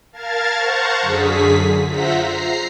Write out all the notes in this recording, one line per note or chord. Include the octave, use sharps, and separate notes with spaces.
A#4 F5 A5 F6 G#6 A6
C5 F5 F#5 A5 A#5 C#6
F#2 D3 G#4 B6
F4 C5 E5 F#5 A#5 B6
A#5 C7